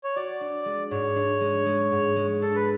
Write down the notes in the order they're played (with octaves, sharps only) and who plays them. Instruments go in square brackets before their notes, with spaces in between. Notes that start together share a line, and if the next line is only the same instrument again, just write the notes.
[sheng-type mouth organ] C#5
[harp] F#4 [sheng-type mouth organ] D5
[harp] D4
G#3
[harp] G#2 [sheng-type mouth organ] C#5
[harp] D4
G#3
G#3
G#2
G#3
[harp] D4 [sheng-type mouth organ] A4
[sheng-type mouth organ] B4